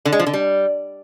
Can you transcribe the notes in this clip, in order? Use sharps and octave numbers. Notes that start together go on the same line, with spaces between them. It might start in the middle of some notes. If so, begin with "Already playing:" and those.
D3
G#3
F3
D3
G3